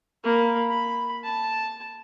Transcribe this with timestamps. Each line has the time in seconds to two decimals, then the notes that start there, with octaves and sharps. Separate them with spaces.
0.24 A#3 B5
0.70 B5
1.23 A5